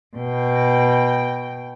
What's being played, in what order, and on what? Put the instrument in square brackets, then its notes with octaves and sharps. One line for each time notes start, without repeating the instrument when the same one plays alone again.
[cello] B2 G5